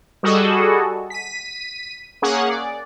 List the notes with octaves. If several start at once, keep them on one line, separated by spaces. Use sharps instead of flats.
G3 F#4 G#4 A4 D#5
B6 D#7
A#3 C#4 G#4 F#5
D5